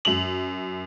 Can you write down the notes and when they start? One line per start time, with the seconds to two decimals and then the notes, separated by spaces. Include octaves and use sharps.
0.05 F#2 F7 F#7